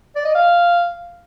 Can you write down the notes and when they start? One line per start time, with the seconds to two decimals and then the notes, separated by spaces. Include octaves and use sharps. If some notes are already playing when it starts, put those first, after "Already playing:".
0.16 D5
0.25 D#5
0.35 F5